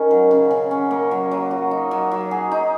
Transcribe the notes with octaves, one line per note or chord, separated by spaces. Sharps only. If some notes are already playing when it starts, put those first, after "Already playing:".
Already playing: D#3 C#4
F#3
C#3
C#3
C#4
A#3
F#3
F#3
F#4
D#4
F#3
F#3
G#4
D#4